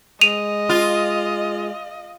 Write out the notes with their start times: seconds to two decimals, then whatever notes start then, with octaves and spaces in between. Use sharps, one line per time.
0.21 G#3 D#5 D#7 F7
0.69 F4